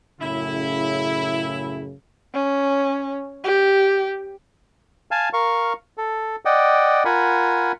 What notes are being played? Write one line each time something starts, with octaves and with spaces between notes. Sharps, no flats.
F#2 A2 C#3 E4
C#4
G4
F5 G#5 A5
A#4 F5 C#6
A4
D5 D#5 F#5 G5
F4 A#4 F#5 G#5 B5